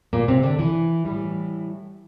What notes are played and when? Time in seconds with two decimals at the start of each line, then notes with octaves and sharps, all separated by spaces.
0.13 A#2 A#3
0.28 C3 C4
0.43 D3 D4
0.59 E3 E4
1.05 A2 E3 G3